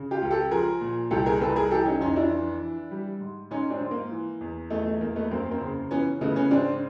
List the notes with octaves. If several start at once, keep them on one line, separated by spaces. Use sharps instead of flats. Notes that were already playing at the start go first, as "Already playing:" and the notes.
Already playing: C#3
F4 G4
C#2
G4 A4
F3 G#4 A#4
A#2
C2 G4 A4
G#4 A#4
C2 A4 B4
G#4 A#4
E3 G4 A4
C#4 D#4
F2 C#4 D#4
D4 E4
E3
E3
G3
G#2
G#2 C#4 D#4
C4 D4
G#2
A#3
E3
E2
E2 A3
A3
E2 A#3
A3 B3
F#2 A#3 C4
A#3 C4
C#3
E3 B3 C#4
C#3 A3 B3
B3 C#4
G#2 C4 D4